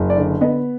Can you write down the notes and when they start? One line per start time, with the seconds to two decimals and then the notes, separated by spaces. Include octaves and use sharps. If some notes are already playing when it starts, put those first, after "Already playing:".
Already playing: F#1
0.10 D5
0.17 D3
0.41 B3 D#5